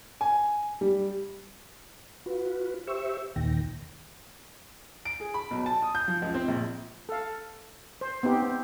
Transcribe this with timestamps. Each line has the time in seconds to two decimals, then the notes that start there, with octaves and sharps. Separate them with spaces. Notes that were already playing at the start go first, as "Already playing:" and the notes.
0.21 G#5
0.81 G3
2.26 F4 F#4 B4
2.87 G4 C5 E5 C#6 E6
3.36 D#2 A#2 D#3 G5 A#6
5.05 D7
5.20 G#4
5.34 B5
5.51 B1
5.66 A5
5.82 D#6
5.95 G6
6.08 F3
6.22 C#2
6.34 C4
6.48 A#1
7.09 A4 F5
8.01 C5
8.23 B3 C4 D#4 G4 C5
8.42 C4